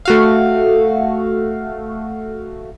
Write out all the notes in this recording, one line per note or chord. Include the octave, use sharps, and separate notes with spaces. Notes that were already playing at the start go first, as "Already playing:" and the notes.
A3 F#4 F5